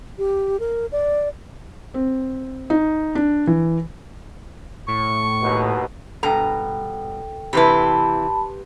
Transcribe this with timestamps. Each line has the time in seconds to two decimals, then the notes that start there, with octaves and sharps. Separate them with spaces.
0.18 G4
0.60 A#4
0.92 D5
1.94 C4
2.70 D#4
3.15 D4
3.47 E3
4.88 A2 C#6
5.41 D#2 B2
6.23 G2 B2 A4 G5 A#5
7.53 C3 E3 E4 G4 B4 C5 A5 B5